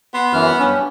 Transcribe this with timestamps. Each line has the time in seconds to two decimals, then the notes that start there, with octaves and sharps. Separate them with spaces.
0.14 B3 C6
0.33 F#2 E3 F6
0.59 G2 C#4